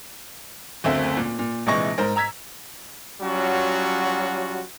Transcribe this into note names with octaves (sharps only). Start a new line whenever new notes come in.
F#1 D2 A3 C4 E5
A#2
A#2
A#1 C3 E3 G#3 C#6 A#6
G#2 A#4 C5
A#5 E6 G#6 B6
F#3 G3 C#4 F4 F#4